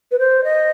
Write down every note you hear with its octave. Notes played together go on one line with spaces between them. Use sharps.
B4
C5
D#5